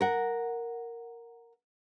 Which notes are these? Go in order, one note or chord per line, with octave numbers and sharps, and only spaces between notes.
A#4 F#5